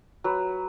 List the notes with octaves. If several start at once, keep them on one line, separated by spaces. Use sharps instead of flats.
F#3 B4